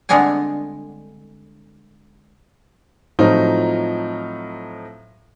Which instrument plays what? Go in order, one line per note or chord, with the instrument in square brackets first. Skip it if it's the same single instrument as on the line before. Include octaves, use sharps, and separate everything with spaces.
[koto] D3 G3 G#3 B3 C4 G#5
[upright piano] A2 F3 F#3 C4 D#4 F4